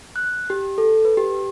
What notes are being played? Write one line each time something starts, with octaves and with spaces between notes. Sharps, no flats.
F#6
G4
A4
B4
G4